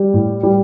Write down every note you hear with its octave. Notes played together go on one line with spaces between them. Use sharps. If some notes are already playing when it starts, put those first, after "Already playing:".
Already playing: G3
A2
G3